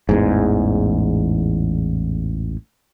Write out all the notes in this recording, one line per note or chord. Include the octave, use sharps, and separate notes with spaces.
A1 E2 G#2